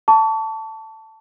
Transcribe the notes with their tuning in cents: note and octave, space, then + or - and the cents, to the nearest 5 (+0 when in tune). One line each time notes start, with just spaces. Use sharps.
A5 +10 C#6 +40